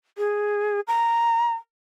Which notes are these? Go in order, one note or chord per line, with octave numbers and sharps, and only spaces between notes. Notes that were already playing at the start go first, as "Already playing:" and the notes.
G#4
A#5